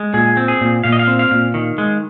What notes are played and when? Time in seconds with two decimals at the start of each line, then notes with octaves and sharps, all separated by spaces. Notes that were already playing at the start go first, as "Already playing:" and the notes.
Already playing: G#3
0.14 A#2 G#4
0.37 C4
0.48 G#4
0.61 A#2
0.84 A#2 F5
0.92 D#5
0.99 F5
1.07 C4
1.19 F5
1.31 A#2
1.54 D#3
1.78 G#3